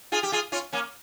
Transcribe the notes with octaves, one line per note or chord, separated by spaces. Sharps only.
F4 G#4
G4
F4 G#4
C#4 F4
A#3 C#4